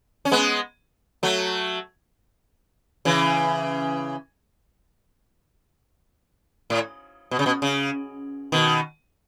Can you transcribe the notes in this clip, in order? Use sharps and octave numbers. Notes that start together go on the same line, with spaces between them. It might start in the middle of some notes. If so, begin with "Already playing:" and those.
C#4
G#3 B3
F#3 A3
C#3 E3
A2
B2
C#3
B2
C#3
B2 D#3